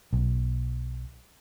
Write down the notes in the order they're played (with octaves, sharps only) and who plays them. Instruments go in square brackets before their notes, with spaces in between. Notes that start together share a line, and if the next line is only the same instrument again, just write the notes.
[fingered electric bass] B1